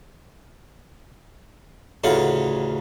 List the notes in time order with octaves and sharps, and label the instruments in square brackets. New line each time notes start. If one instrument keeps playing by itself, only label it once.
[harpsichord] A1 D2 C#3 F4 F#5